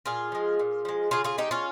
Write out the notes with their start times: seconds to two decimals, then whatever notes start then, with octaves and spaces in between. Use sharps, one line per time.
0.05 A#2 F4 G#4
0.32 F3 G#3
0.60 A#2
0.85 F3 G#3
1.11 C#3 F4 G#4
1.24 F4 G#4
1.38 G#3 D#4 G4
1.51 C#4 F4